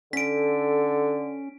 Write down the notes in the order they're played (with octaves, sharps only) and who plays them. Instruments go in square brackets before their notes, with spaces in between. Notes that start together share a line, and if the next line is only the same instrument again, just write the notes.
[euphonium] D3 [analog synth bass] C#4 [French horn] A4 [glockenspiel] B6 D7